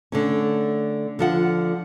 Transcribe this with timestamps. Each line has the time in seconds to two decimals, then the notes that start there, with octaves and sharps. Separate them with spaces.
0.12 D3 A3 C#4
1.19 D3 F3 F#5